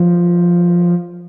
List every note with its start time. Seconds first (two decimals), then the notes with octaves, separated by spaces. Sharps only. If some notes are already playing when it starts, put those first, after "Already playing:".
Already playing: F3